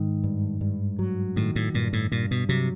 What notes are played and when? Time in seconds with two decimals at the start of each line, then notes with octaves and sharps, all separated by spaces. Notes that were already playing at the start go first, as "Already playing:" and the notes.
Already playing: G#2 D#3
0.24 G2
0.61 G2
0.99 F#3
1.36 A2 D#3
1.56 A2
1.74 G2 A#2
1.93 A2
2.11 G2 A#2
2.31 B2
2.49 C3 F#3